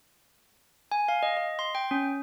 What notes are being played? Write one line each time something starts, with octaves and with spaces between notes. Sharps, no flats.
G#5
F5
D#5
D#5
C6
G5
C#4